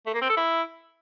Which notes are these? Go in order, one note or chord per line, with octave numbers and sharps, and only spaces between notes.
A3
A#3
C4
A4
E4